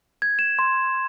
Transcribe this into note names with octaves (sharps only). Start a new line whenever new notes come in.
G#6
E7
C6